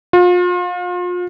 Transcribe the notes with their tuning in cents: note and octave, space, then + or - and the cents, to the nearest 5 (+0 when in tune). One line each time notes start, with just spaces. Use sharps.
F4 +35